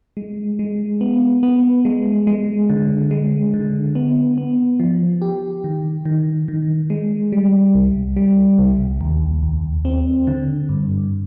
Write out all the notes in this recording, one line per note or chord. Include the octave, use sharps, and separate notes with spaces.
G#3
G#3
B3
B3
G#3
G#3
D3
G#3
D3
B3
B3
F3
G4
D#3
D#3
D#3
G#3
G3
C2
G3
C2
D#2
D#2
C4
D3
G2